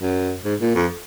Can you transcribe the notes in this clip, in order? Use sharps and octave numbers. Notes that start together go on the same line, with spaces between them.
F#2
G#2
A#2
F2